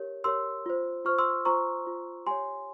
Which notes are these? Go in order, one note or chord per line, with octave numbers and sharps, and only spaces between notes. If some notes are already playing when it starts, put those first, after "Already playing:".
Already playing: G4 A#4 C#5
G4 A#4 C#5 C6 E6
F4 C5
F4 C5 C#6 F6
C6 E6
F4 C5 A#5 C#6
F4 C5
G4 C#5 G#5 C6